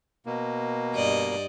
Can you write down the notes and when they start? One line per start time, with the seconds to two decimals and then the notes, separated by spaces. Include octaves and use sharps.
0.26 B2 A#3
0.95 G2 D5 D#5